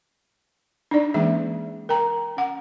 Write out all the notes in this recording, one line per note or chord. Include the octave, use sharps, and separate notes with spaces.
D4 D#4 D5
E3 G#3 A#3 C#4 G#4 E5
A#4 G5 A#5
C#4 F#5